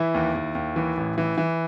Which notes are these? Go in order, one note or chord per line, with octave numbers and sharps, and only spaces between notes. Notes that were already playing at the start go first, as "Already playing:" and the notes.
Already playing: E3 E4
D#2
D#2
D#2
E3
A1
E3
E3